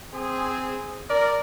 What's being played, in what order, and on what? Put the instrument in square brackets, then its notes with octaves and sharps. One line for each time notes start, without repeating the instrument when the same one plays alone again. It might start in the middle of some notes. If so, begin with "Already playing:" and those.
[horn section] C4 G#4
[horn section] A#4 [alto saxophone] D5